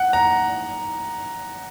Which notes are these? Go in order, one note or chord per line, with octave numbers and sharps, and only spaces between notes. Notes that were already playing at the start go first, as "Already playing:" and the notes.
Already playing: F#5
A#5